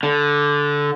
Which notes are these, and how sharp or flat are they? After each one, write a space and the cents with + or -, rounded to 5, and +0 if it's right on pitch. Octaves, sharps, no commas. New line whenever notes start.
D3 -10